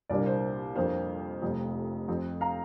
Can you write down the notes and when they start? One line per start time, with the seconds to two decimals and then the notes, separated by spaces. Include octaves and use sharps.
0.10 C2 A#2 A#3 D4 D5
0.26 C5
0.75 F2 F3 A#3 D4 C5 F5
1.42 F1 F2 C3
2.08 F2 F3 C4
2.41 F5 A#5